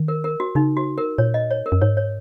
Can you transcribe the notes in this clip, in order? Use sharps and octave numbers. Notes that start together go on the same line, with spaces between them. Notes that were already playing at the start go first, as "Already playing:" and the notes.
Already playing: D#3
A#4
A#4
F#4
C#3 D#4
F#4
A#4
A#2 C#5
D#5
C#5
A#4
F#2
G#2 C#5
C#5